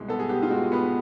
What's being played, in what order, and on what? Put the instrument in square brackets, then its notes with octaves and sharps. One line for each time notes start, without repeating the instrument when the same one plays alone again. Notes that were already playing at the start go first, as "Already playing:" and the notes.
Already playing: [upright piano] C2 B2 G#3
B3 A4
G#4
B3 G4
F4
G#3 F#4
B3 B4